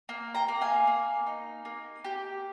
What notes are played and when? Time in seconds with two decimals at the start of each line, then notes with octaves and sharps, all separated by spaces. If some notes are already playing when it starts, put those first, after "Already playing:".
0.09 A#3
0.35 G5 A#5
0.48 A#3
0.61 F5 G#5
0.87 A#3
1.27 D#4
1.65 A#3
2.05 G4